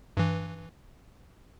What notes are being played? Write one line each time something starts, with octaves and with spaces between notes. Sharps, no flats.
G2 E3